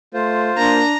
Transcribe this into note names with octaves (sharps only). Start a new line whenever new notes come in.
A3 F4 C5
A#3 D4 A#5